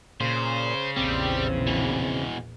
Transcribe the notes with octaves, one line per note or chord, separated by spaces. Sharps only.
A#2 C#3 C5
A#1 E2 G3 C4
B2 E3